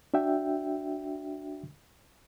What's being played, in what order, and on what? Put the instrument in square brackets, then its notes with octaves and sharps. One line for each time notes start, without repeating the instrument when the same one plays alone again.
[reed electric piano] D4 F#4 E5 G5